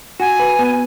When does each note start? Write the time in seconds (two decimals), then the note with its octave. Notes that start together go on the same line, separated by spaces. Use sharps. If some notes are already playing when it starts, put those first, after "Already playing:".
0.20 F#4 G#5
0.39 B4
0.59 B3